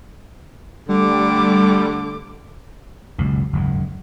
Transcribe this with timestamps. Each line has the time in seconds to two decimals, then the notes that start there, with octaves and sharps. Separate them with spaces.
0.89 D3 G3 A3 D6
3.18 F#1 C#2 B2
3.53 F#1 D#2 G#2